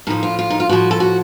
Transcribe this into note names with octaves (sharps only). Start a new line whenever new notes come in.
A2 F3 D#4
F4
F4
D#4
F4
A2 F3 F#4
A4
F#4